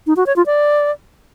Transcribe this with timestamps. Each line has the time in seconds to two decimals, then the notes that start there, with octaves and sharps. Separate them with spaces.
0.07 D#4
0.17 F#4
0.26 C#5
0.36 F4
0.46 D5